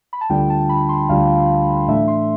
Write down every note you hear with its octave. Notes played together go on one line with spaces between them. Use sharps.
B5
A5
D2 D3 G3 D4 F4 G5
A5
B5
C6
D2 D3 G3 D4 F4 F5
A2 E3 A3 D4 E5
C6